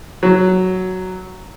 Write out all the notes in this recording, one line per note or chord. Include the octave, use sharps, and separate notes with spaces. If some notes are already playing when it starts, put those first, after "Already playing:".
F#3